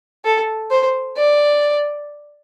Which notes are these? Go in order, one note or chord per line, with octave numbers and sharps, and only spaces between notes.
A4
C5
D5